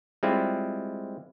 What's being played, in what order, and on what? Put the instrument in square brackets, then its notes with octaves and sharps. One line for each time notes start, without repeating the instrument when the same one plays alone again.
[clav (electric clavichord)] G3 G#3 C4 E4 F4